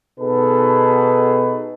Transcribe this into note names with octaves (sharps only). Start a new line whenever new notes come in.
B2 B3 D#4 G#4 A4 B4